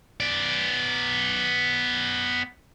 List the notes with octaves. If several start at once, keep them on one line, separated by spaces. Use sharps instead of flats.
B3 D5